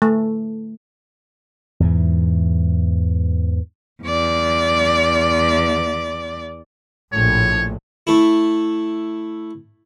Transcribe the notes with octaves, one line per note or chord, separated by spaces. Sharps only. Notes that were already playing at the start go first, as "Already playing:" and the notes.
A3
E2 G#2 E3
E2 D5
A#1 A2 C#5
A3 E4